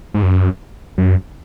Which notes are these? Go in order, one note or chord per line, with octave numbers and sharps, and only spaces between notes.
G#2
F#2
F#2